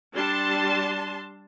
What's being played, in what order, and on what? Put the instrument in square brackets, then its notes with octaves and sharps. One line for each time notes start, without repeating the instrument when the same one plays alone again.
[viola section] G3 D4 A5 C6